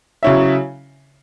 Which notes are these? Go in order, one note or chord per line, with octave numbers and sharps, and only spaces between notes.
C#3 F#3 E4 C#5 E5